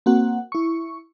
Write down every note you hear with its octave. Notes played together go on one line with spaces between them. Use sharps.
A#3 C4 F#4 F#5
E4 C#6